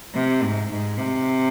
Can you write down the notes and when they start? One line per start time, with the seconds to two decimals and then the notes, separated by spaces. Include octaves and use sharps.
0.14 C3
0.42 G#2
0.71 G#2
0.98 C3